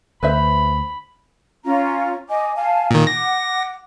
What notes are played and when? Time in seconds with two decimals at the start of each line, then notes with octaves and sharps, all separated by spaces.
0.23 D2 B4 C5 E5 B5
1.65 C#4 F4 A#5
2.29 D#5 G#5 D6
2.56 F5 G#5 A5
2.91 A#2 D#3
3.07 F#5 D6 A#6